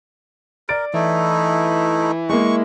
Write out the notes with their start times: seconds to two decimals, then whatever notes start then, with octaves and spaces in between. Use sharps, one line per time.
0.69 A#4 D5 A6 D7
0.94 E3 A3 D#4 E4
2.29 G#3 A#3 C#6